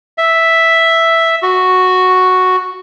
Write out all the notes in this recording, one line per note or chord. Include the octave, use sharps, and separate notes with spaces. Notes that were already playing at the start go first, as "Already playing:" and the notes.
E5
F#4